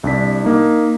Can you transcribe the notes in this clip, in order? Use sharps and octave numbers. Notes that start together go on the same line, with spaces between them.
C2 D4 B6
A#3 D#4